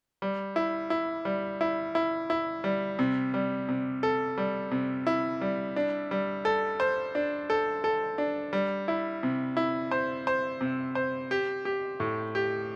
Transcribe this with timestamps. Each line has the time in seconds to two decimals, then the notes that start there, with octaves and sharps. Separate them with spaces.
0.22 G3
0.56 E4
0.90 E4
1.25 G3
1.61 E4
1.95 E4
2.30 E4
2.64 G3
2.99 C3
3.34 G3
3.69 C3
4.03 A4
4.38 G3
4.71 C3
5.07 E4
5.41 G3
5.76 D4
6.11 G3
6.45 A4
6.80 C5
7.15 D4
7.50 A4
7.84 A4
8.18 D4
8.53 G3
8.88 E4
9.23 C3
9.57 E4
9.91 C5
10.27 C5
10.61 C3
10.95 C5
11.31 G4
11.65 G4
12.00 A2
12.35 G4